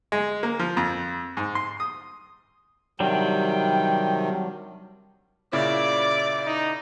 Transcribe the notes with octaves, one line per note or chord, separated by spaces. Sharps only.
G#3
A#3
F3
F2
G#2
C6
D#6
C3 D#3 F#3 G3 D4 G5
A#2 C#3 E4 D5 D6
D#4